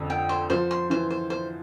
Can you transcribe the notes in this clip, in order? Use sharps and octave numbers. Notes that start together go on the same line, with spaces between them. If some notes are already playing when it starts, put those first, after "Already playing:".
Already playing: F2 D3
G5
C5
F3 C5
C6
E3 C5
C5
C5